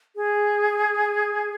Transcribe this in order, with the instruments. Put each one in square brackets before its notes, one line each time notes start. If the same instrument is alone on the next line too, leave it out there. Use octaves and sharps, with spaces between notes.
[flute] G#4